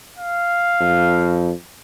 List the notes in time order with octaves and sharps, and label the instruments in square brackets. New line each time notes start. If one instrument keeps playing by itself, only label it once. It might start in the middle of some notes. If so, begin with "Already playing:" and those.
[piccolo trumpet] F5
[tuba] F2